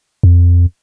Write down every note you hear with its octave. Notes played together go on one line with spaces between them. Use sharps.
F2